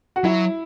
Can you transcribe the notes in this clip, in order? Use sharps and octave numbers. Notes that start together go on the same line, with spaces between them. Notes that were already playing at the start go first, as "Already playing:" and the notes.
F#4
F#3 E4